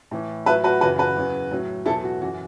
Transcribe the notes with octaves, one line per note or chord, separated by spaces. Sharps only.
A2 E3
A2 F#3 B4 E5
F#4 B4
F#2 C#3 E3 F#4 B4
F#4 B4
E2 C#3 F#3
A2 F#3
E2 B2 F#3 E4 A4
F#4
F#2 E3 F#4